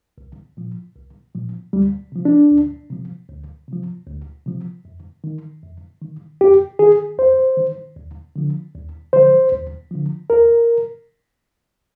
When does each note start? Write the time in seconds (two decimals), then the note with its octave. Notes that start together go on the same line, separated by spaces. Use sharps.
0.18 C2
0.57 A#2 F3
0.96 C2
1.35 A#2 F3
1.73 D2 G3
2.12 C3 F3
2.25 D4
2.51 D2
2.90 C3 F3
3.29 D2
3.68 C3 F3
4.07 D2
4.46 C3 F3
4.85 F2
5.24 D#3
5.63 F2
6.02 D#3
6.41 F2 G4
6.79 D#3 G#4
7.18 F2 C5
7.57 D#3
7.96 D#2
8.36 D3 F3
8.74 D#2
9.13 D3 F3 C5
9.52 D#2
9.91 D3 F3
10.30 D#2 A#4